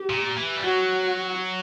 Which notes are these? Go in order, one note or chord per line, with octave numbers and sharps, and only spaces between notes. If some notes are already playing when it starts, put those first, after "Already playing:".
Already playing: G4
A#2
E3
G3
F#3 F#4